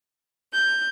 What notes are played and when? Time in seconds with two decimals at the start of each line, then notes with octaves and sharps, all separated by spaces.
0.52 G6